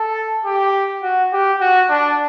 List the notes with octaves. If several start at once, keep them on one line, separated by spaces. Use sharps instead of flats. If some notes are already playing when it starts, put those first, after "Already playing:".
Already playing: A4
G4
F#4
G4
F#4
D4